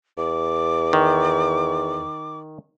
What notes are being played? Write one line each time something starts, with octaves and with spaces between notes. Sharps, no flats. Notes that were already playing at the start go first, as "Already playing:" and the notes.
E2 D6
D#3